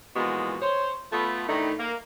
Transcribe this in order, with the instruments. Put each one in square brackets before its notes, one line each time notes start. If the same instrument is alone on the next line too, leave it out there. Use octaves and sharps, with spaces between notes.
[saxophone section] A#2 E3 F3 G#3 B3 F#4
C5 C#5
A3 B3 F4
A2 D#3 E3 A3 D4 D#4
A#3